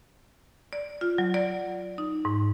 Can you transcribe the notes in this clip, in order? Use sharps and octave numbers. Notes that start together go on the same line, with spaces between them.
D5
F4
F#3
D5
D#4
G#2